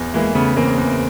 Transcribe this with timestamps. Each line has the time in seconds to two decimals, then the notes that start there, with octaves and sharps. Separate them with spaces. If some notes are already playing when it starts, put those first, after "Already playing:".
Already playing: E2
0.14 E3 G#3 A#3
0.35 C#3 A3 B3
0.56 E2 A#3 C4
0.78 E2